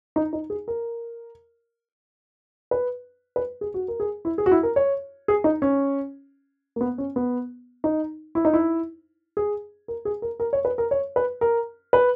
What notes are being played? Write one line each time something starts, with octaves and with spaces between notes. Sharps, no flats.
D#4
D#4
G#4
A#4
B4
B4
G#4
F#4
A#4
G#4
E4
G#4
F#4
E4
A#4
C#5
G#4
D#4
C#4
A#3
B3
C#4
B3
D#4
E4
D#4
E4
G#4
A#4
G#4
A#4
A#4
C#5
B4
A#4
C#5
B4
A#4
B4